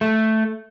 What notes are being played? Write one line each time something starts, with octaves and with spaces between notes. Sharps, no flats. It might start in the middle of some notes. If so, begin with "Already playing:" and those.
A3